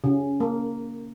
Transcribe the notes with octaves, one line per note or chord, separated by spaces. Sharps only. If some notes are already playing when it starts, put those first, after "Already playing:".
C#3
A#3